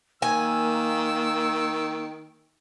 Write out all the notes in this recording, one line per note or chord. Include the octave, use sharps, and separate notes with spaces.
D#3 A#3 G#5 E6